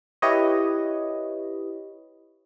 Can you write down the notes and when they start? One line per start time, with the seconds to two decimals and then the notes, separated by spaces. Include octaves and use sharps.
0.22 E4 G4 B4 C#5 D#5